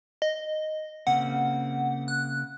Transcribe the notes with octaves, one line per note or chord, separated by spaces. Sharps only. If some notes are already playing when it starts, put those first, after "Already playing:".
D#5
C#3 A#3 C4 F#5
F#6